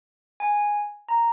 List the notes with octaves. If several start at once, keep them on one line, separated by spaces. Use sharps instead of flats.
G#5
A#5